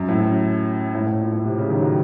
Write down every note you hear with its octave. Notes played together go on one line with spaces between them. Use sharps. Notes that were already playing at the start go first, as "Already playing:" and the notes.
Already playing: F#2
A2
F#2
A2
A2
A#2
A2
C3
C#3
D#3
F#3